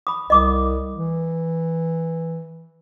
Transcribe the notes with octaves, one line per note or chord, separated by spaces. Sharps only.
B5 D#6
C2 D#5 D6 D#6
E3